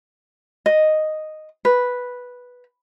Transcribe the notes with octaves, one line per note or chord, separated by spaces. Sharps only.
D#5
B4